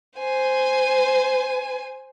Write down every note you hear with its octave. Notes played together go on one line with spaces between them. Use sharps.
C5 G#5